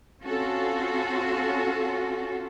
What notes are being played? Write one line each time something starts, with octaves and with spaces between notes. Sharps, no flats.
C4 C#4 F4 F#4 A4